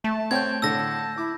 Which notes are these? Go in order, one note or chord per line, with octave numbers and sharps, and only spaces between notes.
A3 A5
C4 C#5 G5 G6 G#6
A2 D3 A5 E6 A#6
E4 D6